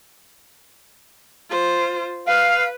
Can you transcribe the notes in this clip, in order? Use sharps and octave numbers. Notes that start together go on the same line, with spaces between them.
F4 C5
B4 F5